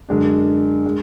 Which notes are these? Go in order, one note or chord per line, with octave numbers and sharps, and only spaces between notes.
F#2 D3 G#3 D4
G#3